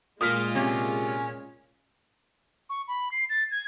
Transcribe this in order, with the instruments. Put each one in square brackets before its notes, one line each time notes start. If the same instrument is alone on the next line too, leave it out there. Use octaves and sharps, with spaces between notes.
[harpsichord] A#2 A#3 C6 [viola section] G#3 F4 [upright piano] D#6 F6 B6
[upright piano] C3 [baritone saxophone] C#4
[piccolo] C#6
B5
C7
A6
G#6